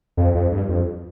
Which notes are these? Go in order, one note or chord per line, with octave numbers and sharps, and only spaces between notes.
F2
F2
G2
F2